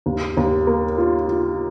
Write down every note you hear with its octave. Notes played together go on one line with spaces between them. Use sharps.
D#2
D#2
A#3
F4
F4